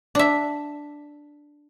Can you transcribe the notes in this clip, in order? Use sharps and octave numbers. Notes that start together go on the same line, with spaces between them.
D4 E5